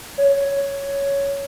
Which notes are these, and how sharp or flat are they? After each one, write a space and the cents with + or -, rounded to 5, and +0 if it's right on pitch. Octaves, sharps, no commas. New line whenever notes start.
C#5 +5